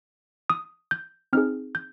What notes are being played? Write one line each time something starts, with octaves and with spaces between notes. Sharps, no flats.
D#6
G6
C4 D#4 G#4 F6
G6